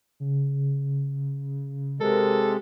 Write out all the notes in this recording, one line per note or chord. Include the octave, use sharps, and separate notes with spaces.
C#3
C3 G#3 A4 A#4